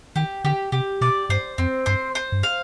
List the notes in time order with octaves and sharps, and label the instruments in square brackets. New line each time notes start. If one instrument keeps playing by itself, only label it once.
[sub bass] D#3 [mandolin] G4
[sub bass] D3 [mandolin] G4
[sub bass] C3 [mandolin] G4
[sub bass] B2 [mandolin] D5
[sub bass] G2 [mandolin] C5
[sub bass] F2 [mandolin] C4
[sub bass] G2 [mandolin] C5
[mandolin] C5
[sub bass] G2
[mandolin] F5